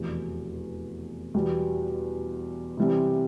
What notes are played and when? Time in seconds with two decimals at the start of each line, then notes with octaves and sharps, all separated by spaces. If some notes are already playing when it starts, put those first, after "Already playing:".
Already playing: F1 E2 B2
1.34 E2 B2 G3
2.77 C3 E3 G3 C4